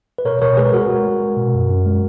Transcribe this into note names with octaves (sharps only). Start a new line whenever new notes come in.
B4
B2 A#4 C#5
B2 A#4 C#5
G#3 G#4 B4
G#3 F#4 A#4
G#3
G#3
G#3
B2
F#2
F#2
G#3